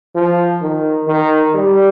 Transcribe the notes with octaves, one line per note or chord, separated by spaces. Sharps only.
F3
D#3
D#3
G3